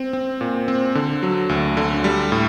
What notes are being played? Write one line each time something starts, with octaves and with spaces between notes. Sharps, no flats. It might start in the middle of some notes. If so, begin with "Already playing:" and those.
Already playing: C4
C4
A#2
C4
D3
F#3
D2
D3
G3
A2